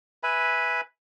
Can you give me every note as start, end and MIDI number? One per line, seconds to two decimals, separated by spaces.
0.23 0.81 71
0.23 0.81 76
0.23 0.81 80
0.23 0.81 83